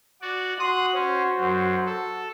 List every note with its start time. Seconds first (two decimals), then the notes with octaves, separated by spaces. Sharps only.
0.22 F#4 D5
0.59 F#4 C6 D#6 F#6
0.94 C#4 C5
1.39 F#2
1.86 A4